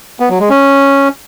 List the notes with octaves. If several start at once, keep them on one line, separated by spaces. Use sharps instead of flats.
B3
F#3
G#3
C#4